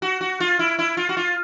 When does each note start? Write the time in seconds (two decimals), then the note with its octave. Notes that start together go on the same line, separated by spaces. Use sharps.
0.02 F#4
0.21 F#4
0.40 F4
0.59 E4
0.79 E4
0.97 F4
1.09 F#4
1.17 F4